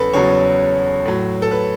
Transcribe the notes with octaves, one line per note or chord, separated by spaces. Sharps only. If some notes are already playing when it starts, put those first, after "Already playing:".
Already playing: E2 C#3 F#3 A4 B4
E2 C#3 F#3 C#5
A2 F#3
A4
B4